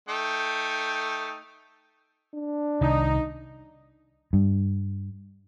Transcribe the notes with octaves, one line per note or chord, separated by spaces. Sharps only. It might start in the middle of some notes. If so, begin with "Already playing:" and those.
A3 D#4 G5
D4
C2 D#3 D#4
G2